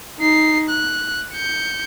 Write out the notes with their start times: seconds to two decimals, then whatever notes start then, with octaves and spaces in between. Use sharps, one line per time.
0.20 D#4 C7
0.69 F#6
1.33 G6 C#7